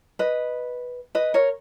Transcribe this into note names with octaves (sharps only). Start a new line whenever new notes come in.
B4 D#5
B4 D#5
A#4 C#5